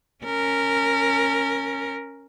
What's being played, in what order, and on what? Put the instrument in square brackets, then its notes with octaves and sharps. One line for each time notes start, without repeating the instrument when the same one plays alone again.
[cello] C#4 A#4